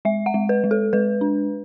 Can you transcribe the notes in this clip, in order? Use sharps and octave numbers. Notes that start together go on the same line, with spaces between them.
G#3 E5
F#5
G#3
B4
G#3
A4
G#3 B4
D4